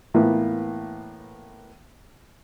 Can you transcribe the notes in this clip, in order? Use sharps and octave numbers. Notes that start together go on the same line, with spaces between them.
A2 E3 A#3 B3 F4